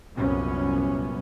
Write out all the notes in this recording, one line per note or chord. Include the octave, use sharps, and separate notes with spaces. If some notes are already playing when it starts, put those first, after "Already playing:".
C2 F#2 A#2 B3 C#4